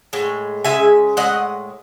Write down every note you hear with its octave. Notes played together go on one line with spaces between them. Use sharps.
A2 G#3
C#3 G#3 E5 G#5
A2 G#3 D#5 F#5